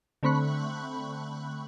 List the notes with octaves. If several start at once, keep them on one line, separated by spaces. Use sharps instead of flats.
D3 A3 C4 B5 C#6 F#6